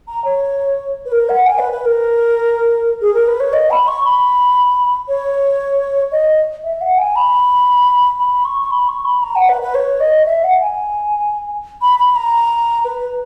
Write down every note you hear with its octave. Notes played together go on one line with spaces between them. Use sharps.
A#5
C#5
B4
A#4
F#5
G#5
B4
B4
A#4
G#4
A#4
B4
C#5
D#5
B5
C#6
B5
C#5
D#5
E5
F#5
G#5
B5
B5
C#6
C#6
B5
C#6
B5
A#5
F#5
B4
B4
C#5
D#5
E5
F#5
G#5
B5
B5
A#5
B4